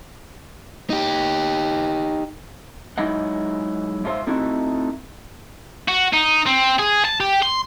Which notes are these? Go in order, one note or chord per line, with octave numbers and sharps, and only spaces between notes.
D#4 G4
F#3 G#3 D#4 E4 D#5 F#5
G#2 E4 F4 A4 C5 E5
A3 C4 D#4 E4 F#4
F#4
D#4
C4
G#4
A5
G4
C6